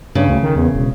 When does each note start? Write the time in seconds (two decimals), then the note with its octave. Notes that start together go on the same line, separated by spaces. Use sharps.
0.15 G2 C#3
0.27 D2
0.43 D#3
0.56 E2
0.74 E1